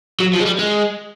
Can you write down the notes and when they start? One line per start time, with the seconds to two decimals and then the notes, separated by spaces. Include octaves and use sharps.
0.20 F#3
0.33 F3
0.40 G#3
0.45 G3
0.59 G#3